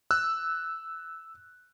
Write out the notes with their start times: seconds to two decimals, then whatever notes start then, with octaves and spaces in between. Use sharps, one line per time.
0.11 E6 F#6